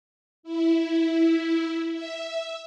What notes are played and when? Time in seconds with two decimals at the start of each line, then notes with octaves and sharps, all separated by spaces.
0.43 E4
1.92 E5